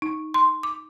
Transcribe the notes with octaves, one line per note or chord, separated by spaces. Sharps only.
D#4
C6
D6